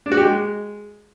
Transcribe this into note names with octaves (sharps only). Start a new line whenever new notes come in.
D4
F#4
G4
G#3